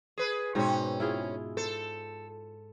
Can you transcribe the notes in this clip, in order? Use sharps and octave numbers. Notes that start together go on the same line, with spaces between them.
G#4 B4
G#2 B2 C4 C#4
E4 F4 G#4
A4 C5